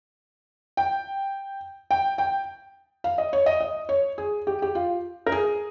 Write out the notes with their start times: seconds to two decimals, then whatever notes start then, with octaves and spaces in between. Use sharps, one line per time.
0.77 G5
1.91 G5
2.18 G5
3.04 F5
3.18 D#5
3.33 C#5
3.46 D#5
3.61 D#5
3.89 C#5
4.18 G#4
4.47 G4
4.62 G4
4.75 F4
5.26 A#4
5.32 G#4